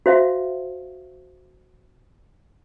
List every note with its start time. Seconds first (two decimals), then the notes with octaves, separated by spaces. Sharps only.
0.06 F#4 C5 E5 F5